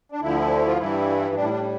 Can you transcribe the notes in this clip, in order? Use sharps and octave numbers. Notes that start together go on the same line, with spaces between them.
D4
D2 D3 F3 E4
F4
G2 E3 G3 E4
A2 G3 D4
E4
D4